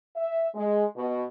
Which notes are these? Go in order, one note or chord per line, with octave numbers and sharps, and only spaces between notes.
E5
G#3
B2